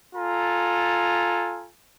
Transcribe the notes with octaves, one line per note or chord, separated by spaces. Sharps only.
F4 A4 G#5 A#5